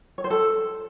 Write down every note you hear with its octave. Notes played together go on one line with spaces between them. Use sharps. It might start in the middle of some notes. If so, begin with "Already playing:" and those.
C#5
C5
A4